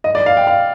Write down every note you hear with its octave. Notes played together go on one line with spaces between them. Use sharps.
D#5
D5
F5
G5
F5